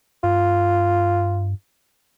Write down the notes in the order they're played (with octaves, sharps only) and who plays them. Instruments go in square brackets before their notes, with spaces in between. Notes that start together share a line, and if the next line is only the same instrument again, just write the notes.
[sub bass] G2 [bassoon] F4